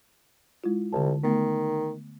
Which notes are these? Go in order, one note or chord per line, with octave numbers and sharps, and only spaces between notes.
G#3 E4 F4
C2 D3 A5
D#3 A3 B3